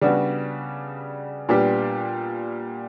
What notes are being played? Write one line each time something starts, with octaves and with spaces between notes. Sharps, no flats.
C#3 G3 B3 D4 F#4
A#2 G3 B3 D4 G4